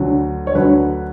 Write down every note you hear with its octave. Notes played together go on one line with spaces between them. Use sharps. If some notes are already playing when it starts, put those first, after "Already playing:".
Already playing: D2 D3 F#3
C#5
D2 D3 F#3 B4